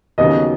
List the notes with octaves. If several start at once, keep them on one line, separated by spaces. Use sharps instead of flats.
D#2 C#3 F#3 B3 D#5